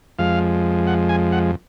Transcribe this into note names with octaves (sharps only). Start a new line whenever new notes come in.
F2 F3 G#3 F5
F#5
G#5
F#5